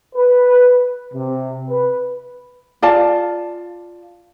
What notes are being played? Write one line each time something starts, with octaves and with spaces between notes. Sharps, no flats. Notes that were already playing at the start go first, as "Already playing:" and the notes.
B4
C3
B4
F4 D5 F5 A5